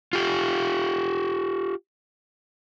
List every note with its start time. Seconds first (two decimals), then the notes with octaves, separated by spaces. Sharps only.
0.13 F4 G4